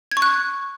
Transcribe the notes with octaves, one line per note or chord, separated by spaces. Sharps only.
G#6
C#6
F#6